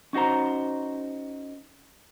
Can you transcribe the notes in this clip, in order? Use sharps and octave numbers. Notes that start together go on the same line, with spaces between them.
C#4 D#4 F#4 C5 A#5